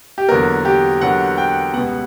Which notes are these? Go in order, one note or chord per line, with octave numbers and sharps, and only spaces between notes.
G4
E2 D3 F#3 A#3 A#4
G4
E2 D3 F#3 A#3 F#5
G5
C#2 B2 G3 B3 F#5